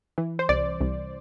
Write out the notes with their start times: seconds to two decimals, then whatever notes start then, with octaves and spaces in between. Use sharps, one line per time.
0.18 E3
0.39 C5
0.49 C2 D5
0.81 C2